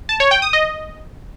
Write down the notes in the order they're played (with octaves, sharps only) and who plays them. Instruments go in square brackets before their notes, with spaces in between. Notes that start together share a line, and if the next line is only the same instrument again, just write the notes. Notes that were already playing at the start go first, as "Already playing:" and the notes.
[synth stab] A5
C#5
G5
D#6
D#5